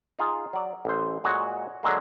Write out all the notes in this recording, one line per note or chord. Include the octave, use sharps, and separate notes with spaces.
D#4 F4 G#4
F#3 D5
A1 C5
A#2 G#3 F#4 C#5 G#5
D3 F#3 G#3 A#3